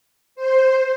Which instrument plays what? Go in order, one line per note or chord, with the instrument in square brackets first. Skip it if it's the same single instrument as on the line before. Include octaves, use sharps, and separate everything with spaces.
[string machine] C5